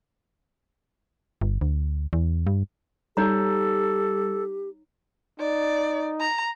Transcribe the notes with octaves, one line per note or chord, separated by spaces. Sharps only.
G1
D2
E2
G2
G3 D#4 G4 A4 C#5 A#5
D#4 D5
A#5